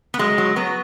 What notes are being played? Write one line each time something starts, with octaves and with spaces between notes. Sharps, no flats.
B3
F#3 G#3
F#3
F#3 B3